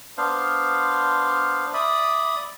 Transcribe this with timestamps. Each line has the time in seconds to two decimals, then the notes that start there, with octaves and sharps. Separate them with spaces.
0.17 B3 D4 C5 F5
1.74 D5 E5 B5 D#6